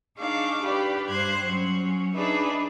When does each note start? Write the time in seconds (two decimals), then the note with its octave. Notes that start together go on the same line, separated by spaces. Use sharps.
0.18 D4 D#4 G#4 F5 C#6 D6
0.63 G4 B4 D5
1.08 G2 C5 F#6 G#6
1.42 F#3 C#4
2.14 D4 D#4 G#4 B4 D5 E5